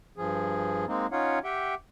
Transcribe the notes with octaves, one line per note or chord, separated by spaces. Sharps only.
G2 F3 G#4
G#3 A#3 C4 D#4
C#4 D#4 F4 C#5 F5 F#5
G4 E5 F#5 G5